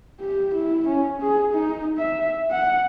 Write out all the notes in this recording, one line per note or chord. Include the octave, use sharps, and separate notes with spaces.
G4
E4
C#4
G#4
D#4
E5
F#5